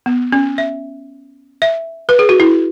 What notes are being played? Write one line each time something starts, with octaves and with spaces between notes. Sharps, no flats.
B3
C#4
E5
E5
B4
G#4
F#4
E4